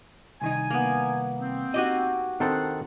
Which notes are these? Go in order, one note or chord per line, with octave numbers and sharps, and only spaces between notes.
C2 D#3 D#4 G#5
A#3 B3
C4
D#4 F#4 G4 D#5 G#5
D#3 C4 D4 A4 C5 F#5